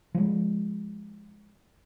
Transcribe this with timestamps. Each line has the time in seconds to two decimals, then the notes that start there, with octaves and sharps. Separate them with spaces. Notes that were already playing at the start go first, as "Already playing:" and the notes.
0.14 F3 G#3